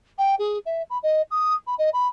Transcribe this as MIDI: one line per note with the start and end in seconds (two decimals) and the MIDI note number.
0.18 0.35 79
0.39 0.58 68
0.66 0.82 76
0.90 0.98 83
1.03 1.22 75
1.31 1.55 87
1.67 1.75 83
1.78 1.90 75
1.93 2.07 83